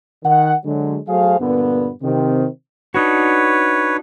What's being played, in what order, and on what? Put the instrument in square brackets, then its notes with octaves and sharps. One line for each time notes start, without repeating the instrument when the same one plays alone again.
[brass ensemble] D#3 F#5
D3 F#3 G#3
F#3 A3 G#4 C5 F5
G2 A#2 D3 B3
C3 D#3 C4
[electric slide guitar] D4 D#4 F#4 [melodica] B4 C#5